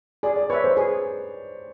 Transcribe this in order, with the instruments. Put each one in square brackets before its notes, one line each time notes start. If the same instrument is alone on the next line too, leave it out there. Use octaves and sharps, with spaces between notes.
[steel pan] G#4 [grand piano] D5
[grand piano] D5
[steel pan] B4 E5 [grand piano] C#5
[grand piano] C5
[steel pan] G#4 [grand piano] B4